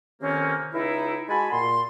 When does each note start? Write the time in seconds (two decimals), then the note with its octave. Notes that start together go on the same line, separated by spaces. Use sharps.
0.21 F2 C3 D#3 A#3 C4 C#4
0.73 C#2 D#4 E4
1.29 G#3 F#4 G#5 A5 B5
1.52 A#2 C6